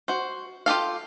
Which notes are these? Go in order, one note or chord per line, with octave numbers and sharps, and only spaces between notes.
F#4 C5
F4 G4 A4 F5